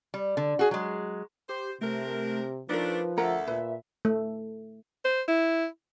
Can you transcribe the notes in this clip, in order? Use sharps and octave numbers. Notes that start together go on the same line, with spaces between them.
G3
D3
F#4 G#4
F#3 G#3
G4 C5
C3 A3 C4 D4 A#4
F3 A3 D4 D#4 A#4 B4
D2 A4 A#4 E5 F#5 A#5
A#2 B4
A3
C5
E4